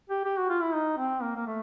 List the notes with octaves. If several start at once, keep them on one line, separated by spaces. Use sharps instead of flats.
G4
G4
F#4
F4
E4
D#4
C4
A#3
A#3
A3